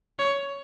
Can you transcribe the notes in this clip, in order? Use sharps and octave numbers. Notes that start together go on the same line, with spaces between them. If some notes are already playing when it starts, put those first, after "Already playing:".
C#5